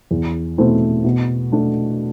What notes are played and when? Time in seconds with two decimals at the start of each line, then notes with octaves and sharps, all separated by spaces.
0.11 E2
0.58 B2 A3 C4 E4
1.04 B2
1.52 A3 D4